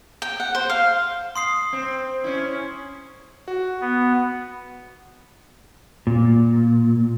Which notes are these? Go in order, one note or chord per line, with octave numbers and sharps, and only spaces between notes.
G5
F#5
C5
F5
C6 D#6 C7
C4
C#4 E4
F#4
B3
A#2